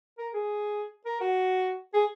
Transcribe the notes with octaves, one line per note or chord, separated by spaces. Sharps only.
A#4
G#4
A#4
F#4
G#4